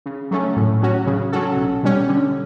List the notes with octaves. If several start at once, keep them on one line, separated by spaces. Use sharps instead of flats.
C#3
F#3 A3 C#4
A2
F#3 C#4 F#4
C#3
F#3 C#4 F#4 A4
B1
B2 G3 C#4
D3